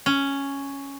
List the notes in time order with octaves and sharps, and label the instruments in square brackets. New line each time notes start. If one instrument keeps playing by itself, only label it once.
[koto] C#4